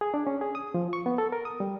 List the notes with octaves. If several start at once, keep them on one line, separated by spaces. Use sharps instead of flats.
G#4
D4
C#4
G#4
D#6
F3
C#6
B3
A4
A#4
D#6
G3